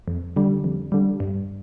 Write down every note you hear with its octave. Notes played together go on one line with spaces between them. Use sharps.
F2
D3 G3
F2
D3 G3
G2